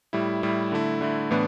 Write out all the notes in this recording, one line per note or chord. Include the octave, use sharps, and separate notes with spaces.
A2 G3 E4
A2 G3 E4
D3 A3 E4
D3 A3 E4
A2 E3 B3 D4